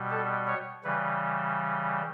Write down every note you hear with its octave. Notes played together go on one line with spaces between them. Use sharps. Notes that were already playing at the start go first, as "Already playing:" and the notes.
Already playing: B2 G3
A4
C#5
C#3 E3 G3 B4